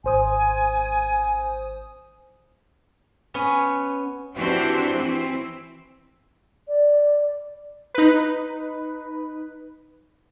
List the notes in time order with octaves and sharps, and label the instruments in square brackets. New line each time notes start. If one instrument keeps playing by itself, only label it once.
[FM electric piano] G#1 C5 D#6 [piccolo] G#5
[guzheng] B3 C#4
[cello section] E3 C4 D4 F#4 G4 C5
E3 C4 E4
[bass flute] D5
[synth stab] D#4 B4